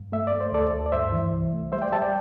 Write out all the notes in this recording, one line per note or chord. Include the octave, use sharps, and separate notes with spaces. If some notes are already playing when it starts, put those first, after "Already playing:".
Already playing: G2
A3 E5
D5
A3
C5
D2 A4 D5
D2
D5
G2 C5 E5
E3
C2
A3
G3 C5 E5
D5 G5
G3 E5 A5
D5 G5